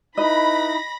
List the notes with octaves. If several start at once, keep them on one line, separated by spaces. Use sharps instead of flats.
D#4 E4 B4 D#5 B5 A#6